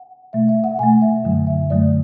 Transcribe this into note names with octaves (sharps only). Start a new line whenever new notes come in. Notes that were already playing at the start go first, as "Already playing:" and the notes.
Already playing: F#5
B2 A3 E5
E5
F#5
B2 A3 G#5
E5
F#2 D3 F#3 A3
E5
F#2 D3 F#3 A3 D5